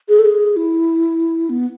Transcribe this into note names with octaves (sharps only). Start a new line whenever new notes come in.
G#4
A4
G#4
E4
B3